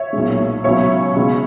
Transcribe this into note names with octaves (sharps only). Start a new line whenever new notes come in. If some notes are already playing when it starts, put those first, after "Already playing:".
Already playing: C#5 E5
B1 A#2 G#3
C#2 B2 F#3 C#5 E5
C#2 B2 G#3